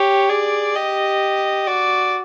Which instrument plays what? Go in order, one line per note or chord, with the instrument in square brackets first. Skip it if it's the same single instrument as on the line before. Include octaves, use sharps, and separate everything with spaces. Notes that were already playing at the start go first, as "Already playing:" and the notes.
Already playing: [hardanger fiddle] G4 [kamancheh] C#5
[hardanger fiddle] G#4 [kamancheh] D5
[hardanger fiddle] G4 [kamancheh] D#5
[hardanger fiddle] F#4 [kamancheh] D5